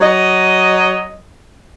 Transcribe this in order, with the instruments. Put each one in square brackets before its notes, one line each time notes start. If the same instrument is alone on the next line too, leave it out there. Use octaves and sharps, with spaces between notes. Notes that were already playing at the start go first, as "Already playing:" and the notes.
[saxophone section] F#3 D#5